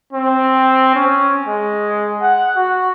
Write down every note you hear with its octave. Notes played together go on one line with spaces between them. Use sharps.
C4
C#4
G#3
F#5
F#4